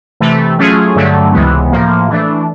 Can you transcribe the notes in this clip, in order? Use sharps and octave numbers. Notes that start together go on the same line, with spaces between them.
C3 E3 A3
F#3 A3 C#4 F4 G#4
G2 D3 F#3 A3
C#2 C3 E3 G#3 B3
A2 F3 A#3
E3 A3 D4